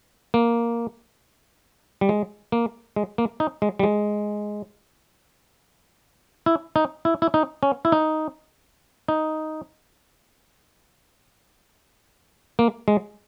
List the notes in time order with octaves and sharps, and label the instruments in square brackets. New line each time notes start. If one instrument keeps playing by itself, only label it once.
[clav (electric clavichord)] A#3
G3
G#3
A#3
G#3
A#3
D#4
G#3
G3
G#3
E4
D#4
E4
E4
D#4
C#4
E4
D#4
D#4
A#3
G#3